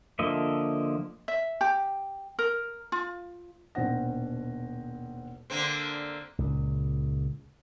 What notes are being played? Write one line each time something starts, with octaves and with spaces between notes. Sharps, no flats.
D3 F3 A#3 D#5 E5
E5
G4
A#4
F4
D#1 B2 C4 D4 F#5 A#6
D3 A#3 C4
C#2 A#2